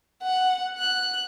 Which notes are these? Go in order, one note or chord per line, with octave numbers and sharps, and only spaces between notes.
F#5
F#6